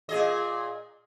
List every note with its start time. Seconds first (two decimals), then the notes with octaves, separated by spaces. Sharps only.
0.09 A#2 G#4 D#5